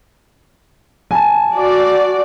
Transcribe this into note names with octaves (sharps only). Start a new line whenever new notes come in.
G#5 A5
F#4 D5